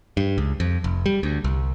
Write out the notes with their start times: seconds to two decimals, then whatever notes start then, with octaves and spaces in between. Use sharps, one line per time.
0.17 G2
0.38 C#2
0.60 F2
0.84 F1
1.06 G3
1.23 D2
1.44 C2